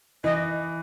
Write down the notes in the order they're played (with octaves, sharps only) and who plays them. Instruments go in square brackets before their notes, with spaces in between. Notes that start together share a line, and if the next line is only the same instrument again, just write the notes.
[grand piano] E3 [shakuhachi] D#5